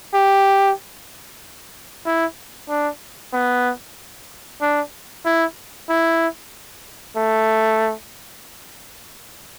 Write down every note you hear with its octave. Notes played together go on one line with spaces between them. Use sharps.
G4
E4
D4
B3
D4
E4
E4
A3